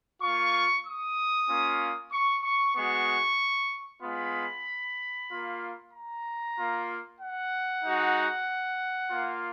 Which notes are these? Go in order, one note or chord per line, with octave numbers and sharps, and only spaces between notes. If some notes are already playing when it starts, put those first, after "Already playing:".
A#3 F4 C#6
D#6
A#3 C#4 F4
C#6
C#6
G#3 B3 F#4 C#6
G#3 B3 F4 B5
A#3 F4
A#5
A#3 F4
F#5
G#3 D#4 F#4
A#3 F4